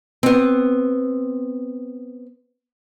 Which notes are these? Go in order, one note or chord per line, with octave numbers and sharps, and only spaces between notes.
B3 C4